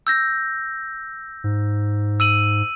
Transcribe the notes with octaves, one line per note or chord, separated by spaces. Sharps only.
E6 G6 A#6
G#2
E6 D#7 F#7